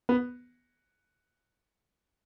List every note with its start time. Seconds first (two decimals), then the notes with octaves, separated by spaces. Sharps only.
0.09 B3